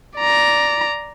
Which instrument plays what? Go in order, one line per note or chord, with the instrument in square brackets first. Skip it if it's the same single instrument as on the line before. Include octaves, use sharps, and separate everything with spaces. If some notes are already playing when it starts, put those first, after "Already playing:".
[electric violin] D5 A#5